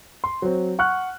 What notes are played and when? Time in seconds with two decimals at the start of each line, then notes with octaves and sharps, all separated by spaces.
0.24 C6
0.42 F#3 C4
0.79 F#5 C#6 F6 F#6